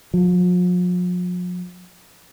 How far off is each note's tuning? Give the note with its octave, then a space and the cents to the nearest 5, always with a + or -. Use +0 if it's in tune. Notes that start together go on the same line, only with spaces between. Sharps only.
F3 +45